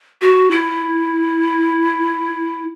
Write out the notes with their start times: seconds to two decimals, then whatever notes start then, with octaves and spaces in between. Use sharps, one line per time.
0.22 F#4
0.51 E4